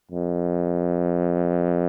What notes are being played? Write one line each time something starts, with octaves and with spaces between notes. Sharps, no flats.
F2